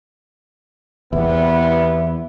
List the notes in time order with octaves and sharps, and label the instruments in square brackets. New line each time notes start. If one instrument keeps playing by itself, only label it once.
[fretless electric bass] E2 [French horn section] C3 G3 B3 [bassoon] E4